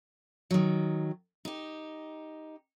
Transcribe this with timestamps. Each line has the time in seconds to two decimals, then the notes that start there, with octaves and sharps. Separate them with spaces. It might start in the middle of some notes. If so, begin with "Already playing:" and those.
0.51 D#3 F#3
1.45 D#4 G4